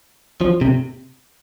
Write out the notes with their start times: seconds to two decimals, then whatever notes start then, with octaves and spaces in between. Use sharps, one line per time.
0.41 F3
0.61 C3